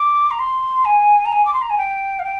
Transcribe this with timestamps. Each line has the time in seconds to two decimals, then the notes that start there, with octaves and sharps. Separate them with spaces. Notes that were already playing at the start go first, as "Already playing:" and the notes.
Already playing: D6
0.30 A#5
0.39 C6
0.85 G#5
1.25 A#5
1.32 G#5
1.45 D6
1.53 C6
1.61 A#5
1.69 G#5
1.77 G5
2.19 F5
2.24 G5